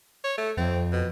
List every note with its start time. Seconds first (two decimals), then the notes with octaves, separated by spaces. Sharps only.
0.24 C#5
0.38 A3
0.57 F2 C4
0.92 B2